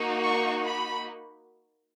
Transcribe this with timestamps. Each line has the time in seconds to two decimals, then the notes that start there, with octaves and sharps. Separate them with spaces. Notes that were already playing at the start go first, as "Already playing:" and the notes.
Already playing: A#3 D#4 F#4
0.26 C#6
0.65 B5